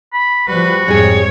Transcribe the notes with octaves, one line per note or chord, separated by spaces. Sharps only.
B5
F3 G3 F#4 B4
F2 G#2 G3 G#4 C#5